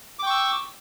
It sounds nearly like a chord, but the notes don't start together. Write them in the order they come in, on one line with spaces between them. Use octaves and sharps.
D6 G5 C#6 E6